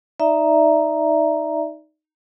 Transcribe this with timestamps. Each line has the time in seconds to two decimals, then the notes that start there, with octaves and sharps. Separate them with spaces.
0.20 D#4 D5 E5 A#5